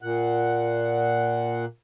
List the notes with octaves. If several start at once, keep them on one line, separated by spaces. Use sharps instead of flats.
A#2 F#5